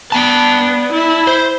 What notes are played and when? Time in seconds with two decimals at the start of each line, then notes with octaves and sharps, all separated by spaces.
0.12 B3 D5 G5 A5
0.92 E4
1.27 C5